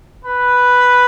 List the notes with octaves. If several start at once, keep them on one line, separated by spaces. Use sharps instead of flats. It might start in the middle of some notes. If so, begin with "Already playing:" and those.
B4